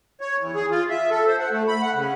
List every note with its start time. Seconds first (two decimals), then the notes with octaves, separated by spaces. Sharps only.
0.21 C#5
0.37 E2
0.55 G#4
0.71 F4
0.89 E5
1.10 A4
1.27 C5
1.39 F#5
1.52 A3
1.68 B5
1.82 F#5
1.95 C#3